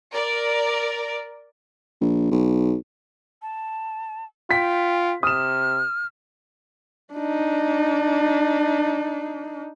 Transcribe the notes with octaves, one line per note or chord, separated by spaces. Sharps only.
A#4 D5
A#1
B1
A5
F4 G5 B6
C3 D#6 F6 E7
D4 D#4